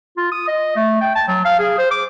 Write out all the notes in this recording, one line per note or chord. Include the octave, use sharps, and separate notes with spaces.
F4
D#6
D#5
A3
G5
A5
F#3
F5
G#4
C5
D6